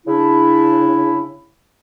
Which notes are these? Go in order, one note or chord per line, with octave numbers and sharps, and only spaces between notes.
C#3 D4 E4